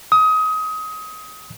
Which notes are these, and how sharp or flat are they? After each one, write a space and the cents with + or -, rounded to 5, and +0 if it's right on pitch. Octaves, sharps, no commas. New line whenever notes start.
D#6 +25